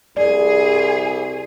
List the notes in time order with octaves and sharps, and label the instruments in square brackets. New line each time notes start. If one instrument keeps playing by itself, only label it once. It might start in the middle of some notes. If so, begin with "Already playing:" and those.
[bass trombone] C2 [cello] G#4 [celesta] D5